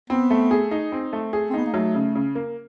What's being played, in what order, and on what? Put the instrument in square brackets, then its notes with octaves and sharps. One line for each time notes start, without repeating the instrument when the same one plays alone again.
[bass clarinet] B3 [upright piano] C4
[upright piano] A3
G#4
D#4
C4
A3
G#4
[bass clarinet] C4
[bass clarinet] B3 [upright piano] D#4
[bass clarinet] A#3
[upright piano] F#3 [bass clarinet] A3
[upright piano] C#3
C#3
A#3